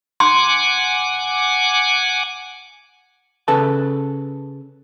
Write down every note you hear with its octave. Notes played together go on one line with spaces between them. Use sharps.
F#5 G#5 C6 D6
C#3 A4 B4 A5